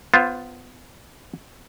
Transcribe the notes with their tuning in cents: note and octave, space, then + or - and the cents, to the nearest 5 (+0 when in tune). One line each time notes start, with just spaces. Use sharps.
B3 +25 F4 +0 C5 +15